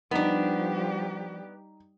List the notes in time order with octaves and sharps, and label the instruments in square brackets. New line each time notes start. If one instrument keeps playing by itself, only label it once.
[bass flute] F3 [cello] G3 G4 [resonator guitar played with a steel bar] B3 D4 [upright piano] D#4